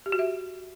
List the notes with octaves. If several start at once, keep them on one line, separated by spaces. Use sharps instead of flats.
G4
F#4
E5